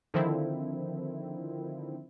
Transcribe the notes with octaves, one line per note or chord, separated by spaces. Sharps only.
D3 D#3 F3 C4 E4